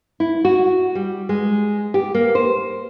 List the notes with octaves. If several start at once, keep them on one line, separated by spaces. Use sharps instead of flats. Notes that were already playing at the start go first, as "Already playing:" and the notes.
E4
F#4
G3
G#3
G4
A#3
C5